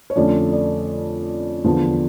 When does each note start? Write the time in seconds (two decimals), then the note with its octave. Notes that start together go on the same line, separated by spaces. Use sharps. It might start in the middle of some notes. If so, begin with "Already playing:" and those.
0.10 C#5
0.16 F2 D3 A3 C#4 D5
0.53 D5
1.64 E2 D3 F3